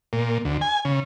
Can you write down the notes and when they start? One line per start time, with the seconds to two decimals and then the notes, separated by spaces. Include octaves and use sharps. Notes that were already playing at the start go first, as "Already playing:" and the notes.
0.13 A#2
0.45 D2
0.61 G#5
0.85 C#3